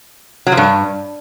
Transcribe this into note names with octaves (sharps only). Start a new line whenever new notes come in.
F#3
F3
G2